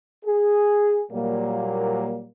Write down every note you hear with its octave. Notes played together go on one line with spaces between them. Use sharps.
G#4
A#2 F#3 G3 A#3